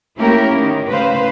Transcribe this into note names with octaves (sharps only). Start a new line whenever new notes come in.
A3 A#3 C#4 E4 G4 A#4
D#3
A2 C#3 B4 C5 F5